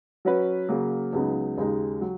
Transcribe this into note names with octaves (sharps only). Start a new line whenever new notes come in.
F#3 C#4 F#4 B4
C#3 F#3 A#3
C#2 C#3 F#3 B3 D#4
D#2 C#3 G#3 D#4
F#3